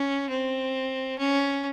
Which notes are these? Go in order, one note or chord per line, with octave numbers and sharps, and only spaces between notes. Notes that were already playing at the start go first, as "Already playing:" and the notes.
Already playing: C#4
C4
C#4